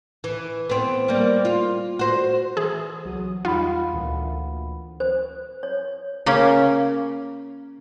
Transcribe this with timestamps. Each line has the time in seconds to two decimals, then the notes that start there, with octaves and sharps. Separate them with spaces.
0.24 E3
0.69 B3 C4
1.08 G3 A#3
1.45 F4
1.99 F#4 C5
2.57 E3 G#4
3.05 C2 F#3 D#6
3.45 E2 G3 D#4 F4 F5 F#5 B5
3.93 D2 A#2 E3
5.00 C5
5.63 C#5
6.26 C#3 A#3 C#4